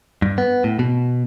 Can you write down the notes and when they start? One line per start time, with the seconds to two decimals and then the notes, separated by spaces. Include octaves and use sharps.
0.22 G2
0.38 B3
0.64 A2
0.79 B2